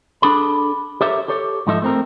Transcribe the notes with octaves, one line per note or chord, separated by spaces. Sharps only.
D4 G#4 A4 B5
G4 A4 A#4 C#5 E5
G4 A4 C#5
G#2 F3 D#4 A4 E5
A3 C4 A#4